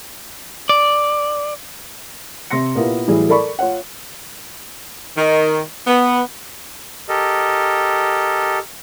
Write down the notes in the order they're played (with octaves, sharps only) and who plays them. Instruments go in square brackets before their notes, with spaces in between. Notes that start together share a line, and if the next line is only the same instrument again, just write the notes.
[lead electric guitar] D5
[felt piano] C3 C4 C6 A#6 C#7
A#2 A#3 B3 E4 F4 G4
A2 E3 F#3 G3 E4 G#4
A4 A#4 D5 B5 C#6
F4 C#5 F#5
[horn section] D#3
B3
[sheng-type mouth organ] G4 A4 A#4 D#5